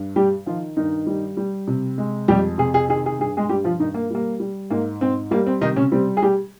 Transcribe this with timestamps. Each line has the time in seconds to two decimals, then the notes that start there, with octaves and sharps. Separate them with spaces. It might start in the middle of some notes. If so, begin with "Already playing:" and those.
Already playing: G2
0.16 G3 G4
0.46 D#3 F3 F4
0.77 G2 D#3 D#4
1.07 G3
1.37 G3
1.67 C3
1.98 G#3
2.28 F2 G3 G4
2.58 C3 G#4
2.74 G#4
2.89 D#3 G#4
3.06 G#4
3.19 G2 G#4
3.37 G#3 G#4
3.49 G2 G3 G4
3.64 F3 F4
3.79 G2 D#3 D#4
3.94 A#3
4.11 G3 A#3
4.40 G3
4.70 G#2 A#3
5.01 G#2 C4
5.31 G3 A#3
5.46 C4
5.61 C3 D#3 D#4
5.76 C#3 C#4
5.92 G3 C4
6.17 G#4
6.22 G3 G4